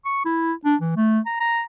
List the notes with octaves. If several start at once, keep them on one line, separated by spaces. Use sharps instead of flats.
C#6
E4
D4
E3
A3
A#5
A#5